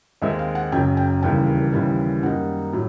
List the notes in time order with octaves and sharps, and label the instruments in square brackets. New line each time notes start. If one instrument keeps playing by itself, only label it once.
[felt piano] D#2 D#3 G#3 C4 E5
F5
F#5
F#1 F#2 C#3 F#3 G5
G5
E1 D#2 C#3 E3 G3 G5
D#2 C#3 E3 G3
F#2 D#3 G3 A#3 D#4 F#5
A2 F#3